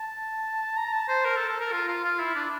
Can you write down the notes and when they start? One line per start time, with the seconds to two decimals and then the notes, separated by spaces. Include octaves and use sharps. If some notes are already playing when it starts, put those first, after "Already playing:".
Already playing: A5
0.77 A#5
0.93 A5
1.08 C5
1.25 A#4
1.36 A4
1.49 A4
1.60 A#4
1.72 F4
1.88 F4
2.04 F4
2.20 E4
2.35 D4